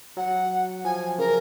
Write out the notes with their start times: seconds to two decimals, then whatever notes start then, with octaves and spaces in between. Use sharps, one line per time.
0.17 F#3 F#5
0.85 F3 G#5
1.18 C#3 A#4